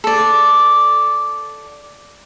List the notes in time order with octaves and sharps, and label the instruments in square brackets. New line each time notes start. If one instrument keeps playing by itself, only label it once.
[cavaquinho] A4 D5